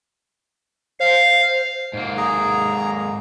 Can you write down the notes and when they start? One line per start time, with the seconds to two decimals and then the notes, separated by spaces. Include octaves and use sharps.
1.00 C5 F5
1.93 G#2 A#3
2.17 G#4 A#5